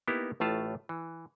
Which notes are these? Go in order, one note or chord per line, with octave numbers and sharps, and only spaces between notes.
A#3 B3 D#4 E4 G4
A1 A2 A3 F4 A5
E3